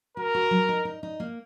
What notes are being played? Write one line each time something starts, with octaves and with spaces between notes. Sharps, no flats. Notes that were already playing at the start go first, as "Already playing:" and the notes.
F#4 A#4
F#4
F#3
D#4
D#4
D#4
A#3